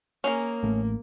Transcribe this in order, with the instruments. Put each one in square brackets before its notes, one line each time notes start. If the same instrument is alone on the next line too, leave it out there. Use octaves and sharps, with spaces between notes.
[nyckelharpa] A#3 [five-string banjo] C#4 G#4 A#4
[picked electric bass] A1 A3